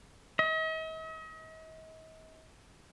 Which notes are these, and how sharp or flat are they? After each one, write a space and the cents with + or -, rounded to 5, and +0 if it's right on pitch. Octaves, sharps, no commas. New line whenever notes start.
D#5 +45